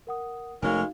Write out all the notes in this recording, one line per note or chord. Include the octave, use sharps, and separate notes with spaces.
A#4 F#5 D#6
F1 G#3 A3 C#4 D#4 F#4 A#4 F5